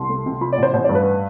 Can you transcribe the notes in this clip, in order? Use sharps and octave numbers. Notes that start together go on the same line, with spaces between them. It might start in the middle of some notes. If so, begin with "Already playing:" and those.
Already playing: C2 C6
A3
C3
F3 B5
D5
A1 C5
A1 C5
G2 D5
B4